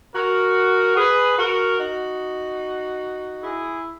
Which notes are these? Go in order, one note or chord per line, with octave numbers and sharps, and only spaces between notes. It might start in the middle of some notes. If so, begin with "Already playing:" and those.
F#4 A#4
G#4 B4
F#4 A#4
D#4 F#4
E4 G#4